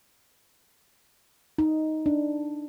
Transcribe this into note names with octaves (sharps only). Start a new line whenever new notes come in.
D#4
D4